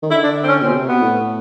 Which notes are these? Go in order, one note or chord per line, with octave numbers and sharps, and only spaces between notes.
D#3
D3 E4
D4
C4
C#4
A#2 C4
B2
C3
B2 B3
A2